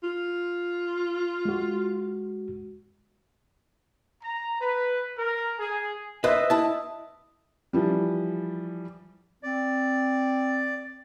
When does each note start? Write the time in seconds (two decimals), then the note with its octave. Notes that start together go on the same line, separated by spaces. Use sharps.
0.03 F4
1.45 G#3 F#4
4.23 A#5
4.60 B4
5.18 A#4
5.59 G#4
6.24 B4 C5 D#5 E5
6.50 E4 A5
7.73 E3 F3 G3
9.43 C4 D5